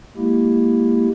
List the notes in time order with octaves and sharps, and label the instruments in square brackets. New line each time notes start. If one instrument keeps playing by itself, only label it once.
[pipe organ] G#3 A#3 E4 G4